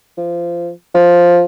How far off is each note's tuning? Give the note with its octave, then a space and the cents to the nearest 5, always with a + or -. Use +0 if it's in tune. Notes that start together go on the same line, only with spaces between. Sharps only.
F3 -20
F3 +5